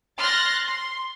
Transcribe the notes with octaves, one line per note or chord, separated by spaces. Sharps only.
C6 F6 F#6 A6 A#6
C6